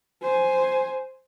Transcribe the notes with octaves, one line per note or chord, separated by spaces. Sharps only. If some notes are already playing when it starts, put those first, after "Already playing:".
C5 G#5